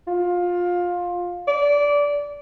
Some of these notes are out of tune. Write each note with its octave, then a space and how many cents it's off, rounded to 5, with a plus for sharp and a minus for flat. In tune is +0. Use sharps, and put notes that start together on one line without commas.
F4 +20
D5 -20